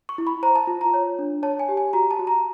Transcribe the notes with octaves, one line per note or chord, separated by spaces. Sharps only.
C#6
E4
B5
C5 A#5
A5
F4
A#5
C#5
D4
C#5 A5
G#5
G4
G#5
F#4 A#5
A5
F#4
A#5